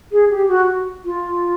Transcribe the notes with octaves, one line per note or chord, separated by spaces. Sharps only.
G#4
G4
F#4
F4